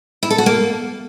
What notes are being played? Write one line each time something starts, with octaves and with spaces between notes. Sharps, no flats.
E4
A4
F#4
A#3